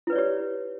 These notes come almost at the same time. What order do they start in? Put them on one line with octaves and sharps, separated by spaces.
E4 B4 D5 C#5 G4